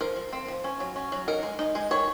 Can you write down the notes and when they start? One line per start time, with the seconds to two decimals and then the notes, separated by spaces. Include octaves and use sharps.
0.01 F3 A#4
0.16 F3
0.33 C4
0.48 F3
0.64 C#4
0.80 F#3
0.96 C#4
1.12 F#3
1.28 D#4 A#4
1.43 G#3
1.59 D#4
1.75 G#3
1.91 D#3 C#5